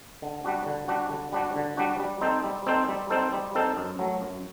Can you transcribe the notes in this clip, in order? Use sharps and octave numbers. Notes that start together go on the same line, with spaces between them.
D3
G3 D4 F#4
D3
G3 D4 F#4
D3
G3 D4 F#4
D3
G3 D4 F#4
G3
C4 D#4 A4 C5
G3
C4 D#4 A4 C5
G3
C4 D#4 A4 C5
G3
C4 D#4 A4 C5
F#2
F#3 A3
F#2